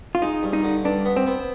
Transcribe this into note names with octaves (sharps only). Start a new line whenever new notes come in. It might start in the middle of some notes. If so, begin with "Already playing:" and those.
F4
G#3 D#4
G2
D#4
D3
G2 D4
B3
C4
B3